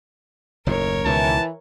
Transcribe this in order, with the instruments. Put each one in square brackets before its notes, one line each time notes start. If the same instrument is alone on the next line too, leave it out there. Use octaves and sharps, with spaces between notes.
[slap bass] F#1 D#2 A2 [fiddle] A#4 C#5
[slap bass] C#2 B2 D#3 [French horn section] E3 [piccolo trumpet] A5